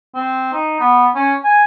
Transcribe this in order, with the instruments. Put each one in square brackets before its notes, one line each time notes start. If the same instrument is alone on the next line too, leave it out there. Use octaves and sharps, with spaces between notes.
[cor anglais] C4
D#4
B3
C#4
G#5